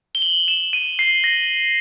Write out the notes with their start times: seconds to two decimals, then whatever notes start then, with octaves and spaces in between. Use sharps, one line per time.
0.15 G7
0.22 F#7
0.48 E7
0.73 D#7
0.99 C7
1.24 A#6